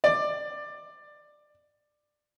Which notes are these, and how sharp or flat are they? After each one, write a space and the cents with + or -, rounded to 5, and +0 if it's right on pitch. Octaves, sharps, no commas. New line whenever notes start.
D5 +15